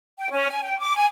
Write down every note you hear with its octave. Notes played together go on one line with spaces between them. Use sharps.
G5
C#4
G#5
G5
D6
G#5